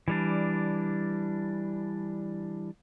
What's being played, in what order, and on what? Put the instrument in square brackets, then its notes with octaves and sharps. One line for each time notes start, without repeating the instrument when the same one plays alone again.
[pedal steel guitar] E3 G3 D4